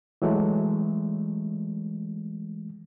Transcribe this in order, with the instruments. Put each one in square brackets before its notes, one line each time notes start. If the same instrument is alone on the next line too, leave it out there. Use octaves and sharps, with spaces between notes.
[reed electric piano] E3 F#3 G#3 A3